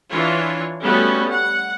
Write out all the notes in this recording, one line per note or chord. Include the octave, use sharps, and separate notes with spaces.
E3 D4 F4 C#5
G3 A3 B3 C#4 F#4
F#5